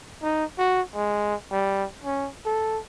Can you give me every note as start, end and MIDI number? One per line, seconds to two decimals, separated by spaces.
0.23 0.45 63
0.58 0.81 66
0.95 1.35 56
1.51 1.85 55
2.04 2.30 61
2.45 2.80 69